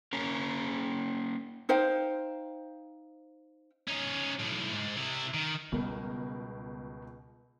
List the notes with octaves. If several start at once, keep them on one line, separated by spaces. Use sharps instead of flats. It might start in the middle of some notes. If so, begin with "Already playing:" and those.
A#3 C#4 A#4
D#4 C5 F5 G5
C#4 D#4
B1 A2
G#2
C3 E4
D#3
C#2 B2 G3 B3 A#4